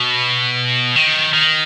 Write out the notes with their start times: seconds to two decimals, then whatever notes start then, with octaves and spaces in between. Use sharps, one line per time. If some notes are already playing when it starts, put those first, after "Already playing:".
Already playing: B2
0.96 D#3
1.34 D#3